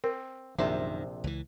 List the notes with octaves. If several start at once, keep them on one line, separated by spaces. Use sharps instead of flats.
C4 A#4
A#1 F#2 C3 D#3 C5 E5
C#2 E3